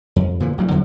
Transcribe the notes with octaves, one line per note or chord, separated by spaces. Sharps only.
F2
A#2 D3 E3 F3
A1 F#3 G3
E2 D3 F3 F#3